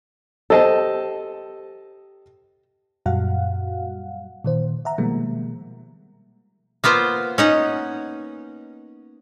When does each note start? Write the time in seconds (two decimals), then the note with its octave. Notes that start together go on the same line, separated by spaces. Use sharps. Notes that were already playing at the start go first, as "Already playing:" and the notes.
0.50 G4 A4 C5 D#5 A5
3.06 F#2 A#2 G3 F#4 F5 F#5
4.44 A#2 D#3 C5
4.85 E5 F#5 A#5
4.98 B2 D#3 F3 G3 G#3 A#3
6.84 A#3 B3 F4 C5
7.38 C#4 D#4 F#5